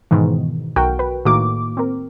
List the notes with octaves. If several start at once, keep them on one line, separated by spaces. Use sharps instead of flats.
G#2 B2 D#3 E3
B1 F#4 A#4 G5
B4
A2 D#3 A#3 F#4 D6
C4 A#4